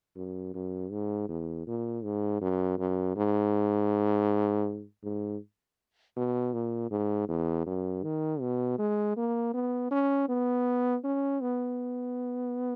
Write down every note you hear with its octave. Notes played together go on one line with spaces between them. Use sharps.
F#2
F#2
G#2
E2
A#2
G#2
F#2
F#2
G#2
G#2
B2
A#2
G#2
E2
F#2
D#3
B2
G#3
A#3
B3
C#4
B3
C#4
B3